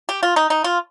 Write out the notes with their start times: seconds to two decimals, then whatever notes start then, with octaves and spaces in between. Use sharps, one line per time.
0.09 G4
0.23 F4
0.36 D#4
0.50 D#4
0.64 F4